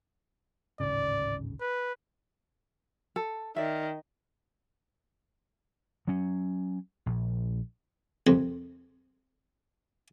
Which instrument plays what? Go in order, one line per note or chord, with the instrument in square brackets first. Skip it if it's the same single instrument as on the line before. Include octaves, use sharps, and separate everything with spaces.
[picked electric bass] D1 G#1 C#3 [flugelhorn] D5
[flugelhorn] B4
[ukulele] A4
[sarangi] D#3 [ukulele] D5 E5
[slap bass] F#3 C#4
A#1
[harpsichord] C2 F2